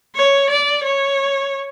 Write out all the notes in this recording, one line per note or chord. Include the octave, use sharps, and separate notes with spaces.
C#5
D5
C#5